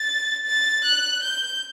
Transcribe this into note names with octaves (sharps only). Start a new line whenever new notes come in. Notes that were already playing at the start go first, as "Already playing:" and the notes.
Already playing: A6
A6
F#6
G6